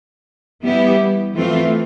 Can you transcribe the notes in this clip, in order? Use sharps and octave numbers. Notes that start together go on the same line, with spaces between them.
E3 G3 B3 E4 G4
E3 A3 C4 F4